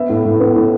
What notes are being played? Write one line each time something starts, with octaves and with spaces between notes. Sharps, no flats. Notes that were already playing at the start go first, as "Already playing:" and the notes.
Already playing: B3 E5
A2
A2
B3
A2